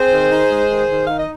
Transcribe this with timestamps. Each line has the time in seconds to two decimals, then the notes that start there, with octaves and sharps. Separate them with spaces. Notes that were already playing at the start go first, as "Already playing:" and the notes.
Already playing: C4 G#4 C5
0.12 D#3
0.32 D#4
0.50 G#3
0.70 D#3
0.91 D#3
1.07 D#4 F5
1.19 D#5